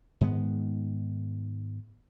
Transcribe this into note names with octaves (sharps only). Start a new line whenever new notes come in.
G#2 D#3 G#3 B3